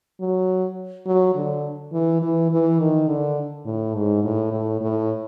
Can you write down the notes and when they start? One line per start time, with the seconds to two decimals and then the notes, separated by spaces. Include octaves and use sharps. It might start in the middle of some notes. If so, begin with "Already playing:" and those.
0.20 F#3
1.06 F#3
1.35 D3
1.92 E3
2.22 E3
2.51 E3
2.79 D#3
3.08 D3
3.65 A2
3.95 G#2
4.24 A2
4.52 A2
4.81 A2